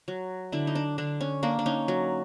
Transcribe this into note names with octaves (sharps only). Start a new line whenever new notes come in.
F#3
D3 D4 E4
D#4
D4
D3 D4
C#4
A#3 D4
D4
C#4 D#4
F#3